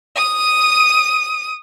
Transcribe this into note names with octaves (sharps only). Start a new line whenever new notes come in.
D#6 D#7